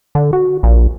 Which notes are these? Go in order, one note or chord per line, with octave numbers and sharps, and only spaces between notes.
D3
F#4
A#1